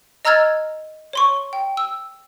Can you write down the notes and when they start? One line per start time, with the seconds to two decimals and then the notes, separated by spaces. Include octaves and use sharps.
0.25 D#5 A#5 E6 F6 G#6 A6
1.13 C#5 C6 C#6
1.53 G5
1.77 E6